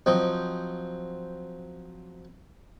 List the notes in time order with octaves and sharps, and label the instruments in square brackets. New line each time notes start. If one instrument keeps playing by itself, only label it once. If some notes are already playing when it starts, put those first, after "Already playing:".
[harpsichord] F3 F#3 C4 D#5 G5